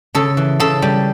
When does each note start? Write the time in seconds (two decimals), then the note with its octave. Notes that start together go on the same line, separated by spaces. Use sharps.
0.15 C#3 A4
0.37 E3
0.60 C#3 A4
0.82 G3